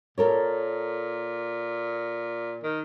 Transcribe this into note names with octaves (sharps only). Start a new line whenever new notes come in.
A#2 A4 A#4 C#5
D#3